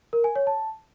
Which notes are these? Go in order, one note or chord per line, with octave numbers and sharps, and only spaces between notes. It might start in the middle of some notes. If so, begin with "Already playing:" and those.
A#4
G#5
C#5
A5